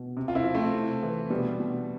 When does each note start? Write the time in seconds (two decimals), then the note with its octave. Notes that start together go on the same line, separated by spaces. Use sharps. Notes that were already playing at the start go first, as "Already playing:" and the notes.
Already playing: B2
0.17 C3
0.28 F4
0.35 C4 E4
0.44 F3
0.55 A3 C4
0.74 C3
1.03 E3
1.30 B2 G3 B3
1.60 B2